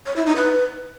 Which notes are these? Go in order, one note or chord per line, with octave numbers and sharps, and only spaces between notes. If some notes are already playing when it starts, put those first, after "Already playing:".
C#5
E4
D#4
B4